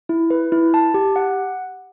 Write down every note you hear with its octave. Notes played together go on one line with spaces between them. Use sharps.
E4
B4
E4
A5
G4
F#5